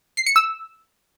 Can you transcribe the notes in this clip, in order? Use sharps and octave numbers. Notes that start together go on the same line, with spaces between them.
C7
C#7
E6